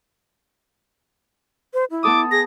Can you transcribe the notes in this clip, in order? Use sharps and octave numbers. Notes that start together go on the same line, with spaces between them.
C5
E4
B3 A4 D6 D#6
G#4 A#6